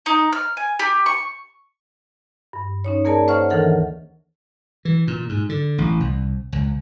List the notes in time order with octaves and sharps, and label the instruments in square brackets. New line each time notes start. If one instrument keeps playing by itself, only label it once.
[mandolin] D#4
F6
G#5
G4
C#6
[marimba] G2
C#4 D#4 C#5
A#3 G#4 A#4 D5 A5
C5 C#5 E5 F#5 C#6 F6
D2 D#3 E3 A4 A#4 F#5
[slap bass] E3
A#2
G#2
D3
A1
C2
C#2